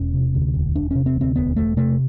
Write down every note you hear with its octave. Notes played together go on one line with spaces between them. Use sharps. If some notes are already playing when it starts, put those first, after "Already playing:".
Already playing: E1 C#4
C3
D2
E1
E1 D4
C3 C#4
C4
D2
C4
E1 B3
E1 A3
C3 A3